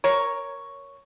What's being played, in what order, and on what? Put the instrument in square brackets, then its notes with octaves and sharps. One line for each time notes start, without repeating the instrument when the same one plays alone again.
[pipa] A#4 C#5